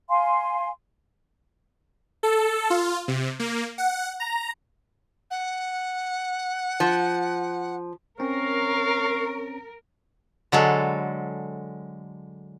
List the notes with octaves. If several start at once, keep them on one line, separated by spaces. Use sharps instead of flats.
F5 G#5 C6
A4
F4
C3
A#3
F#5
A#5
F#5
F3
C4 C#4 A#4 C#5 F5
D3 F#3 G#3 A4